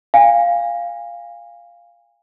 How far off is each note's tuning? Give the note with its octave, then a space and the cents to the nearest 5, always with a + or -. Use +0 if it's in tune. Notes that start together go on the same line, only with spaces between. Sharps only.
F5 +0 G#5 -35